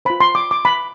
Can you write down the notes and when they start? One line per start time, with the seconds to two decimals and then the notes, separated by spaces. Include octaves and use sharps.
0.05 F4 C5 B5
0.21 C6
0.35 D6
0.51 D6
0.65 B5